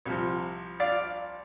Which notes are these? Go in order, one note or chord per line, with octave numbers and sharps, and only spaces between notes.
C2 C3 F3
D5 F5